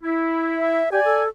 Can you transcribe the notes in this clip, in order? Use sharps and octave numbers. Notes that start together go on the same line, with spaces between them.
E4
E5
G4 D5 G#5
A4